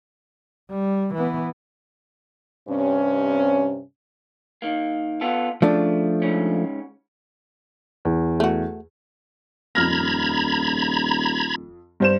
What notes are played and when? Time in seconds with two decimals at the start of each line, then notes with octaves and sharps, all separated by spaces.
0.70 G3
1.14 E3 B3
2.68 G2 C3 C4 C#4
4.62 D#3 A#3
5.21 B3 F4 A4
5.62 C#3 F3 A3 D4
6.22 G#2 C#3 C#4
8.05 E2
8.40 A3 F#4
9.75 D#1 F2 A#5 B5 F6 G#6 A#6
12.00 G2 C5 E7